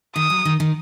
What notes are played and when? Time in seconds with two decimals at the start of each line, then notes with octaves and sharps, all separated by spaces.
0.15 D#3 D#6
0.30 F#3
0.45 D#3
0.60 D#3